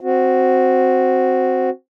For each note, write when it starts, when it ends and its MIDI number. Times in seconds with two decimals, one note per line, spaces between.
0.01 1.70 60
0.01 1.70 66